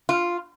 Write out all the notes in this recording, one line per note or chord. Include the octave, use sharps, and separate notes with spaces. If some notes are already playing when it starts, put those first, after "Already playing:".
F4